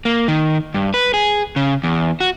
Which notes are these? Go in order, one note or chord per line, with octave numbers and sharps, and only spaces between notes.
A#3
D#3
G2
B4
G#4
C#3
E2
F#4